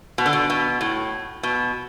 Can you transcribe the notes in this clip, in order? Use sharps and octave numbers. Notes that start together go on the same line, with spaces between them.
B2
D3
B2
B2
A2
B2